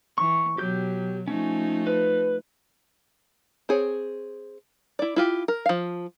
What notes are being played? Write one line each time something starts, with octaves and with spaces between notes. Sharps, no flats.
E3 C#6
B2 F#3 G4 G6
F3 A3 C#4 D#4
B4
C4 G#4 C#5
E4 D5
E4 F4 G4
A#4
F3 F5